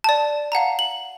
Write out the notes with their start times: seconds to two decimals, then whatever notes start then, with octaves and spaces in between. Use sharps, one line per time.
0.04 D5 A5
0.52 F5 F#5 A5 A#5
0.79 F#7